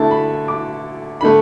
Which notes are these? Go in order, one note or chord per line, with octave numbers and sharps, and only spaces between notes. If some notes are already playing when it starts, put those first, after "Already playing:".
Already playing: D3 A3 E4 E5 A5
B5
D6
D3 A3 B5